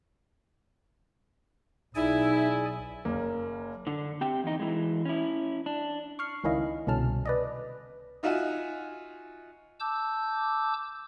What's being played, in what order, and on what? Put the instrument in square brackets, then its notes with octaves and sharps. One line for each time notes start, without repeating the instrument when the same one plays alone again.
[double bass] B1 [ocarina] D#4 [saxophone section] E4 [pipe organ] G#4 D5 G#5
[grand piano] F#1 A#4 [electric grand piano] A#3
[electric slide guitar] D3 D4
C4 G4 G5
E2 D#4
E3 G#3
C#4 E4
D4
[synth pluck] C#6 F6 C7
C#2 D#3 C#4 E4 D#5 F5
C2 B2 D3 C#4 A5 F6
B4 D5 D#5
[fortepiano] D#4 F4 F#4 E5 F#5 G#5
[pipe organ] A5 D6 E6 G6